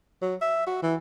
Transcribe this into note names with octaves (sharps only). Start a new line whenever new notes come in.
F#3
E5
F#4
E3